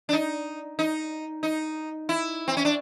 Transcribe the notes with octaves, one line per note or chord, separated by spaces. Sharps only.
D4
D#4
D#4
D#4
E4
C4
C#4
D4